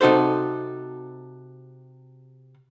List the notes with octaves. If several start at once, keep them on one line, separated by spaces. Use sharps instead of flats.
C3 D#4 F#4 A4 C5